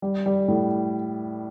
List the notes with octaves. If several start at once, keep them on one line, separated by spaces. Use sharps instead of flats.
G3
G3
A2